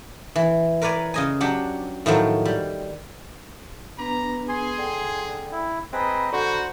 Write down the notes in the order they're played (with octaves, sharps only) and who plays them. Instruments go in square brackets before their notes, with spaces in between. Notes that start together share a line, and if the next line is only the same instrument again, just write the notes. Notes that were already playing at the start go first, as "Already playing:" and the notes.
[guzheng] E3
A#4 B4 C#5 D5 G#5
C#3 D#5 G#5
F#3 D4 G4 F#5
A2 D#3 F3 F#3
G3
[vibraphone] B3 D4 B4 [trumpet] A#5
[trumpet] G#4 [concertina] G#5 C6
[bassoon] D3 [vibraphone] G5
[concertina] E4
[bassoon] C4 [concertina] G#4 B4 [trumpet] D#5 [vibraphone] A#5 B5
[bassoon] D3 [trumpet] F#4 [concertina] C5